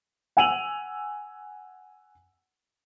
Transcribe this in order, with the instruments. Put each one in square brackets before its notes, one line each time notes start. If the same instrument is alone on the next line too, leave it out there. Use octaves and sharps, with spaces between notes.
[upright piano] F#5 G#5 E6 D#7 F7 F#7